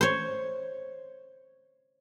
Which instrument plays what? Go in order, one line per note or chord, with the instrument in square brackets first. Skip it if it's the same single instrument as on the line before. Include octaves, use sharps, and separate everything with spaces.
[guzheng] C5 C#5